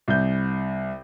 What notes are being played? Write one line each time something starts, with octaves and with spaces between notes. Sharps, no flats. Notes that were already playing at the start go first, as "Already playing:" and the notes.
C2 G6